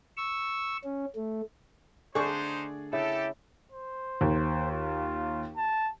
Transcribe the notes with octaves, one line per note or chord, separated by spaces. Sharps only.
C#6 E6
C#4
A3
D3 A3 D4 D#4 G#4 C5 D5 C#6
C#3 E4 G4 A4
C5
D#2
F4
A5